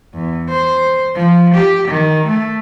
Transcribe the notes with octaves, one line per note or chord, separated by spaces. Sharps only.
E2
C5
F3
G4
D#3
A3